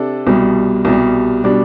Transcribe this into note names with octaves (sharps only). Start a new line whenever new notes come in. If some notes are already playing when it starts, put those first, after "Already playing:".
Already playing: C3 D4 A4
C2 B2 G3
C2 B2 G3
B2 G3 D4